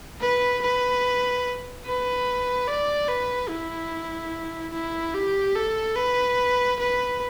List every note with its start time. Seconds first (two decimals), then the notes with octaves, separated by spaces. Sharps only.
0.21 B4
0.62 B4
1.85 B4
2.68 D5
3.08 B4
3.49 E4
4.73 E4
5.14 G4
5.55 A4
5.96 B4
6.79 B4